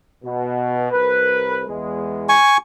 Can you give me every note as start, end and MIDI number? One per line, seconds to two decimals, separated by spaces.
0.24 0.87 47
0.91 1.63 36
0.91 1.63 70
0.91 1.63 71
1.68 2.35 40
1.68 2.35 56
2.29 2.57 80
2.29 2.57 85